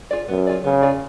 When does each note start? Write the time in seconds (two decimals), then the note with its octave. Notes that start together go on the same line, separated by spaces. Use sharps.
0.11 F4 G#4 D5
0.28 F#2 B3
0.47 F4 G#4 D5
0.64 C#3 B3
0.82 F4 G#4 D5